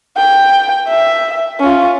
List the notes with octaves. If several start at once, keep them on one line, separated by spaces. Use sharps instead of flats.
G5
E5
C#4 F4